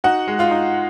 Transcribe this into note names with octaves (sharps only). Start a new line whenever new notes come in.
D#4 F#4 F#5
G#3
F4 F5
D#4